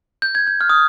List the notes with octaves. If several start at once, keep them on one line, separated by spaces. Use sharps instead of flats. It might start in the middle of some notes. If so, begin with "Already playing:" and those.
G6
G#6
G6
F6
D#6